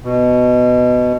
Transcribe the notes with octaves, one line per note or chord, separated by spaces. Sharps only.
B2